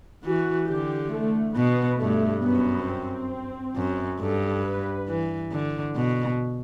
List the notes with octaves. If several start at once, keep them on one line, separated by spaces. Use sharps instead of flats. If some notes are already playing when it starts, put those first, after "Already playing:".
E3 F#4
D3 G4
A3
B2 B3
G2 A3
F#2 B3
C4
F#2
G2 A4
B4
E3
D3
B2